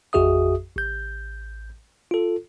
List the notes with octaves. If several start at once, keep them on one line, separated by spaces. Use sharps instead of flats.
A1 F2 F#4 G#4 E5 D#6
A1 G6
F4 A4